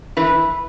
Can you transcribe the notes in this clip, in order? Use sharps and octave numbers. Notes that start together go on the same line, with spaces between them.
E3 B4